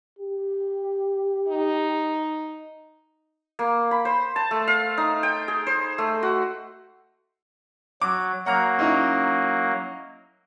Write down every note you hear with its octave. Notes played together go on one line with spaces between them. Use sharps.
G4
D#4
A#3
B5
C5
A5
A3
F5
D#4
G5
G#4
C5
A3
F#4
F#3 D6
F#3 A#3 F#5 A#5 F6
C#4 D#4 E4